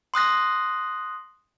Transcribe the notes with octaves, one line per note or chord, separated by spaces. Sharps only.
C6 D#6 F#6 A#6